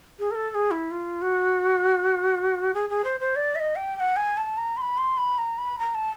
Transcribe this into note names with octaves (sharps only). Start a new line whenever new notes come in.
G#4
A#4
A4
A4
G#4
E4
F4
F#4
G#4
G#4
C5
C5
D5
E5
D#5
G5
G5
F#5
G#5
A5
A#5
C6
B5
C6
B5
A#5
B5
A#5
A5